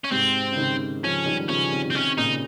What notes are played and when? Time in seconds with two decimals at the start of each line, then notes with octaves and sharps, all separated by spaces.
0.04 C#4
0.11 G#2 C3 C4
0.52 C#3
0.57 C3 D#3
1.03 C#3 F3 C#4
1.26 D#3 G3
1.49 C#3 F3 C#4
1.72 C3 D#3
1.90 C4
1.94 C3 D#3 C#4
2.18 A#2 C#3 D#4